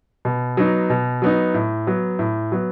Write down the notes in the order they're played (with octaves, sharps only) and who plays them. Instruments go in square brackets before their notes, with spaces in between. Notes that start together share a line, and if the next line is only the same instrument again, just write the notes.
[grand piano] B2
F#3 B3 D#4
B2
F#3 B3 D#4
A2
F#3 B3
A2
F#3 B3